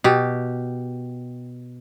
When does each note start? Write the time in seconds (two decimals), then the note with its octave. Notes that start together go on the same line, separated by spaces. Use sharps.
0.04 B2 G4